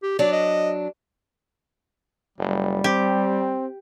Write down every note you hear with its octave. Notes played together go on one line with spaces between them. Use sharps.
G4
F#3 D4 D5
D#5
F#1 G3
C4 G4